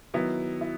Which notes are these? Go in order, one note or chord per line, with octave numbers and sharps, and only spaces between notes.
D#3 F#3 B3 E4
E4